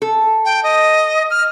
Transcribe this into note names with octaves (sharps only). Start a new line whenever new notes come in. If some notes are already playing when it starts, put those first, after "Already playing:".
A4
G5
D#5
F6